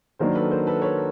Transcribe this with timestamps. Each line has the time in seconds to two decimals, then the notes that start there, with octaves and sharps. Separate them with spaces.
0.19 D#3 F#3 A#3 D4 A#4 C5
0.35 A4 B4
0.51 A#4 C5
0.67 A4 B4
0.82 B4 C#5